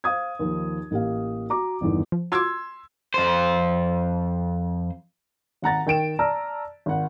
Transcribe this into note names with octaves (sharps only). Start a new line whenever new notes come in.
C5 F5 D#6 G#6
D#2 D#3 F3
A1 A#3 G4 F5
F#4 A#5 D6
G1 E2 D#3
F3
F4 F#4 C6 D6 E6 G#6
F2 C5
G#1 F#5 A#5 A6
D#3 G5 D7 E7
D5 A5 A#5 E6 F6
G#1 F#5